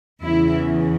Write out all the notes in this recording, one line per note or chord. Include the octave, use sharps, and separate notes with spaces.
E2 C#3 E3 E4